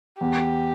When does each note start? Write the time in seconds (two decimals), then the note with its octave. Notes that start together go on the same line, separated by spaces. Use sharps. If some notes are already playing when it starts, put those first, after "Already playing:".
0.21 E2 G4